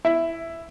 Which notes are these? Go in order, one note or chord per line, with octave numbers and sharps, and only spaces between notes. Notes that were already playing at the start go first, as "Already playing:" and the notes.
E4